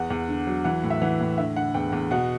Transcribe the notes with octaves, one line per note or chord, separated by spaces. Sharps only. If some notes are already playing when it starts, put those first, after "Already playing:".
Already playing: E2 F#5
E2
D3
F#3
E3 F#5
A2
E5
E3 F#5
A2
D3 E5
D3 F#5
E2 G5
E2
B2 F#5